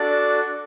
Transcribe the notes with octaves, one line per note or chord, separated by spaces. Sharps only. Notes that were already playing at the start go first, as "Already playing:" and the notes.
Already playing: D4 F#4 A4 D5